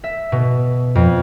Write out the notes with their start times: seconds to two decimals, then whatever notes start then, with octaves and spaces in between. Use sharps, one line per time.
0.04 E5
0.32 B2
0.95 F2